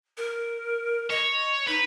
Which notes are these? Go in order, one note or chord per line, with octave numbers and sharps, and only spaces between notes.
A#4
C#5 D#5
D#4 B4